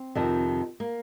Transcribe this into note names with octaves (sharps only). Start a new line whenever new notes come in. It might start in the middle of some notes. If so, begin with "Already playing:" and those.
Already playing: C4
F2 C3 D#3
A#3